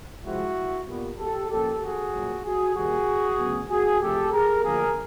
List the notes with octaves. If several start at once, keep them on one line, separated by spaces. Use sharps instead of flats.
C3 F3 G#3 C4 E4 F#4
A#2 G3 B3
G4 A4
A#2 F3 A#3 C#4 G4 A4
F#4 G#4
C2 A#2 F#3
F#4 G#4
D#2 D#3 G3 A#3 F#4 G#4
D2 C#3 F#3 B3
F#4 G#4
C3 F3 A3 G4 A4
G#4 A#4
D2 D3 F3 A#3 G#4 A#4